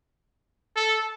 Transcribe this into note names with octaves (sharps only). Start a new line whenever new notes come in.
A4